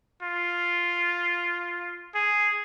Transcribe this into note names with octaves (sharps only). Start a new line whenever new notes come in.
F4
G#4